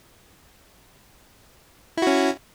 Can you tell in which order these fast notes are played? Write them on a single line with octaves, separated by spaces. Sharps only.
E4 F#4 C#4